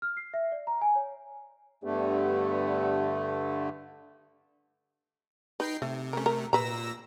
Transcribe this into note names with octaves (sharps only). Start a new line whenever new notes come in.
F6
C7
E5
D5
A#5
G#5
C#5
G2 D3 A3 B3 D4 G4
D#4 B4 G5 C7
C3 A3
C3 A3 C#4 A#4
A#4
A#2 B4 A#5 E6 A#6